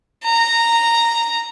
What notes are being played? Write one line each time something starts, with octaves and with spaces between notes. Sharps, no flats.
A#5